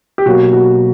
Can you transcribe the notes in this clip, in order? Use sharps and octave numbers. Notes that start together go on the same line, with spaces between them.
G4
B2 F#3 A#3 F#4
F#4